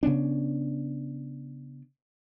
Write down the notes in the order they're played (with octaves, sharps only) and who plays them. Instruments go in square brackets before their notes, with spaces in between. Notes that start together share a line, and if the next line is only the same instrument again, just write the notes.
[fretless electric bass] C#3 B3 C#4 D4